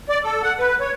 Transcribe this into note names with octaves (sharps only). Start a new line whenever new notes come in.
D5
A4
F#5
B4
C#5